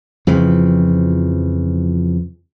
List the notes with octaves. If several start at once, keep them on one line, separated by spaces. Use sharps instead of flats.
F2 C#3 E3 F3